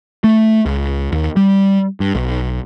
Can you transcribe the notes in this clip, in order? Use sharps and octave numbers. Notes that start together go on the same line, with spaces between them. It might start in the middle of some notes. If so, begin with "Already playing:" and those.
A3
C#2
D#2
G3
G2
B1